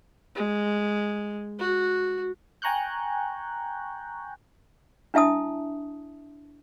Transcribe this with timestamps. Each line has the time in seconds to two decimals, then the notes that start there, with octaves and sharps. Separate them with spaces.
0.35 G#3
1.59 F#4
2.62 G5 G#5 A#5 C#6 F#6 G6
5.14 D4 E4 E5 A5 D#6